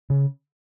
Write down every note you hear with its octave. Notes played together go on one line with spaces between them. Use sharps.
C#3